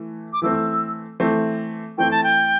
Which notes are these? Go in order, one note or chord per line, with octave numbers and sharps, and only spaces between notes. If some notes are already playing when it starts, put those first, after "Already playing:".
Already playing: E3 A3
D6
E3 A3 C4 E6
E3 A3 C4
E3 A3 C4 G5
A5
G5